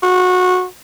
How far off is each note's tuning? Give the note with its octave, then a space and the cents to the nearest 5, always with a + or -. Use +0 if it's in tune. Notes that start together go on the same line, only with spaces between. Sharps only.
F#4 -20